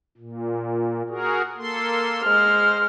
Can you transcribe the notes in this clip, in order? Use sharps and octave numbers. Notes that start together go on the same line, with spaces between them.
A#2
F#4 G#4 A#4
A#3 A4 C6
G#3 C5 F6